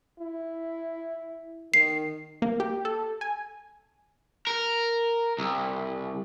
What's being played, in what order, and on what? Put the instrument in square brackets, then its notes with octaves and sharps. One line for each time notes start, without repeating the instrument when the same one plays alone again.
[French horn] E4
[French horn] D#3 [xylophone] C7
[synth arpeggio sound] A#3
G4
A4
G#5
[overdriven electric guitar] A#4
C2